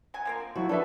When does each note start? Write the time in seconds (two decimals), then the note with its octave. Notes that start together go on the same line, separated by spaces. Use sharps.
0.14 F#3 G#5
0.25 F3 A#3 C4
0.55 F3 F#3 E4 F#4
0.69 B3 D4 A4 B4 E5